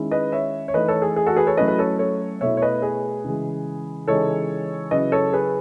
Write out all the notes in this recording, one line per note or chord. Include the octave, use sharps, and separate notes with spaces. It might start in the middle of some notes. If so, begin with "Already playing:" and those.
Already playing: D#3 G#3 C#4 E4
B4 D#5
C#5 E5
C#5
E3 A3 D#4 B4 D#5
A4 C#5
G#4
G#4
F#4 A4
G#4 B4
A4 C#5
F#3 A3 C#4 E4 B4 D#5
B4
A4 C#5
A4 C#5
B2 A3 E4 C#5 E5
C#5
B4 D#5
G#4 B4
C#3 E3 G#3
C#3 E3 G#3 D#4 A4 C#5
C#3 F#3 C#4 E4 B4 D#5
A4 C#5
G#4 B4